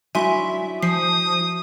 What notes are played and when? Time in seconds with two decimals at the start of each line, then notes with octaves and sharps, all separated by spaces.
0.15 F#3 D4 E4 E5 G#5 C6
0.83 F3 D#6 C7